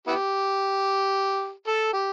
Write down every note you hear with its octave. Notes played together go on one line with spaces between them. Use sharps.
B3 E4 G4
A4
G4